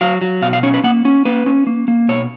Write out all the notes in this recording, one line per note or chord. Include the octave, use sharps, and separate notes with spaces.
F#3 F5
F#3
B2 F5
F5
C#4 C#5
B4
A#3 F#5
C#4
A#3 B4
C#4
A#3
A#3
B2 C#5